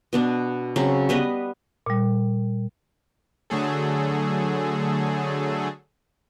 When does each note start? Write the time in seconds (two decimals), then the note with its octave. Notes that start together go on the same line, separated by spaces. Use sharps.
0.13 B2 B3 D4
0.76 C#3 F#3 C4
1.09 G3 B3 B4 D#5
1.86 A#2 G3
3.50 D3 F#3 A3 G#4 A4